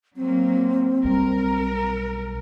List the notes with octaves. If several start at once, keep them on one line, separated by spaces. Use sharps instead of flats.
F#3 A#3 C4
B1 B2 G3 A#4